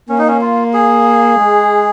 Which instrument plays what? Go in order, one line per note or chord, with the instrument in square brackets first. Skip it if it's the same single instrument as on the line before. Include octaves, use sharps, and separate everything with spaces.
[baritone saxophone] A#3 [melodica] C#4
[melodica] D#4
C#4
F4
G#4
[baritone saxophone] G#3